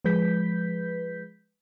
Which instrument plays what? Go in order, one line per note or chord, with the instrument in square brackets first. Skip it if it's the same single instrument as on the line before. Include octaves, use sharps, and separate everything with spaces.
[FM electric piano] F3 G#3 B4 G6 B6